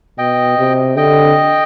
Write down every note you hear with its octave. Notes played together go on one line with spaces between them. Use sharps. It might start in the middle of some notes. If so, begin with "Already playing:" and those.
B2 D#5 G5
C3
D3 D#5 G5